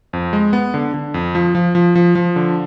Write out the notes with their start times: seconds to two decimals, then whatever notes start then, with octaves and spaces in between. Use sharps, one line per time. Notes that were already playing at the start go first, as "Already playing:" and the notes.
0.13 F2
0.33 G#3
0.53 B3
0.74 D3
0.94 D3
1.14 F2
1.35 F3
1.55 F3
1.75 F3
1.95 F3
2.15 F3
2.36 D3